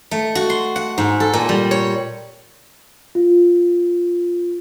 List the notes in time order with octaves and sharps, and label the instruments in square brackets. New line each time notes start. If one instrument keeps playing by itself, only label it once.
[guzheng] A3
F#4
C6
F#5
G#2
A4
A#2
G3
C#5
[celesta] F4